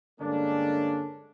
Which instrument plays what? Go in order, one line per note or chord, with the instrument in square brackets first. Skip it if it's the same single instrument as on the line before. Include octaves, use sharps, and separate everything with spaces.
[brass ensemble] G2 D3 G#3 A#3 C#4 D4